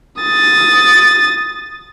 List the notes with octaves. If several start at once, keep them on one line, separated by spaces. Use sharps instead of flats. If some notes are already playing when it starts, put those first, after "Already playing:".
D#6 A6